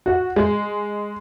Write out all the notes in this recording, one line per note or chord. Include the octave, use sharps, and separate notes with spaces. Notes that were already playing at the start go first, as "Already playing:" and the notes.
F#4
G#3